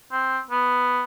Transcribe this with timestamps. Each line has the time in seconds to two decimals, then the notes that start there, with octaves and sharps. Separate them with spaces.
0.12 C4
0.50 B3